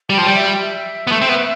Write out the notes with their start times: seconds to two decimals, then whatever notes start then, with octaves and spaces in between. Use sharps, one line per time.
0.09 G3 G5
0.18 F3
0.22 G3 G5
0.35 E5
0.48 G5
0.61 E5
1.07 B3
1.12 A3
1.21 C4
1.29 B3